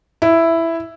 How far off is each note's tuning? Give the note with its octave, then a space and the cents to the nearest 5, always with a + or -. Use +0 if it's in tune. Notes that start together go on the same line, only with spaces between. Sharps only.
E4 +5